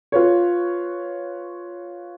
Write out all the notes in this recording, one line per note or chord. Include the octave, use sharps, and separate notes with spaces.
F4 B4 C#5